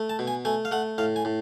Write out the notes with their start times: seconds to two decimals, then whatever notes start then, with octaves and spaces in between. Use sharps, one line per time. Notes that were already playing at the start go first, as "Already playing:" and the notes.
Already playing: A3
0.10 A5
0.19 B2
0.27 G#5
0.45 A3 G#5
0.65 F5
0.71 A3 F#5
0.98 A2 F5
1.16 G#5
1.25 A2